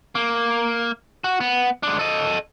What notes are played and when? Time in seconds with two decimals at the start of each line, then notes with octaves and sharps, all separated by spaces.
0.15 A#3
1.24 F#4
1.40 B3
1.83 G#3 D4
1.99 A4 D#5